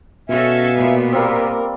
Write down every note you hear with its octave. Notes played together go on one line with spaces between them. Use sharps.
B2 C#4 F#4 A4 E5 F5 G#5
A#2 B3
G3 A#3 C4 A#4